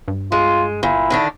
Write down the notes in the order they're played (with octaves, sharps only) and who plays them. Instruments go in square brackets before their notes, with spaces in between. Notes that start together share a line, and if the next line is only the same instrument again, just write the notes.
[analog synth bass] G2
[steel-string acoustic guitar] G#3 [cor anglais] F4
[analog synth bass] G1 [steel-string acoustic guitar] A#2 [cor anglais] E4
[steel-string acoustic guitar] D3 D#3 D4